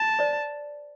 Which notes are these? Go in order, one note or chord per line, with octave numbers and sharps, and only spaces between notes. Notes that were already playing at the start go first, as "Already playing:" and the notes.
Already playing: A5
C5 D5